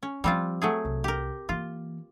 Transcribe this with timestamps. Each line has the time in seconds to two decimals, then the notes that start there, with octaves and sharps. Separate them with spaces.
0.03 C#4
0.24 F3 G3 C4 F4
0.62 F#3 A3 G#4
0.85 C2
1.04 G4 A#4
1.49 E3 A#3 F4